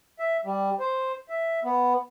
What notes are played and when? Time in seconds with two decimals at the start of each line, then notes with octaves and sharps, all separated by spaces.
0.19 E5
0.45 G3
0.80 C5
1.29 E5
1.64 B3